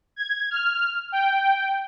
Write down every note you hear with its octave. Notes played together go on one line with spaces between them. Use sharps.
G#6
F6
G5